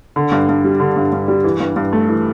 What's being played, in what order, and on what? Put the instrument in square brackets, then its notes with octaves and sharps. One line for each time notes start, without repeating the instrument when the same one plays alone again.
[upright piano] D3
G2
G2
G3
D3
G2
G2
G3
E3
G2
G2
A3
E3